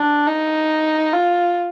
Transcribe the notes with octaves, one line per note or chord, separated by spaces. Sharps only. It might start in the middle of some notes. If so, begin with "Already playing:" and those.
Already playing: D4
D#4
F4